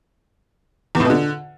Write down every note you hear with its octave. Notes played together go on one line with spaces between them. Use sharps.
E2
A2
B2
D3